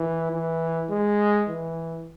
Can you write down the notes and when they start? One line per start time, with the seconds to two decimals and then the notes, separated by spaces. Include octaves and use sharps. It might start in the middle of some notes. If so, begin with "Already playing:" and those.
Already playing: E3
0.32 E3
0.90 G#3
1.49 E3